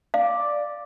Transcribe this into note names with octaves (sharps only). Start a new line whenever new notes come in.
D5 F5